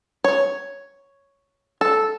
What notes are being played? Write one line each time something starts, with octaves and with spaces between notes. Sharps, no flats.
C#5
A4